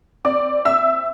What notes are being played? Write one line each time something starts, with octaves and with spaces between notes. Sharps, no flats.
C4 D5 D6
C4 E5 E6